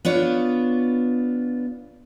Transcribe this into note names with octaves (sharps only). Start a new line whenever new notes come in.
B3 D4 F4 C#5